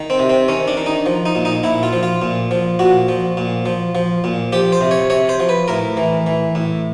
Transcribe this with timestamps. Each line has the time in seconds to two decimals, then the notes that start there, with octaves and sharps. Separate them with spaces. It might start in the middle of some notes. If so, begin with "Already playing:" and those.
Already playing: D#3
0.10 C4
0.19 C3
0.29 C4
0.48 D#3 C#4
0.68 D4
0.77 D#3
0.86 D#4
1.06 F3
1.26 D#4
1.35 A#2
1.45 D#4
1.63 A#2 E4
1.83 F4
1.93 F3
2.03 F4
2.22 A#2
2.51 F3
2.79 A#2 F#4
3.09 F3
3.37 A#2
3.66 F3
3.95 F3
4.24 A#2
4.52 F3 G4
4.72 C5
4.81 C3
4.91 C#5
5.10 C3 C#5
5.29 C5
5.40 F3
5.49 B4
5.68 A2 A#4
5.97 E3
6.26 E3
6.55 A2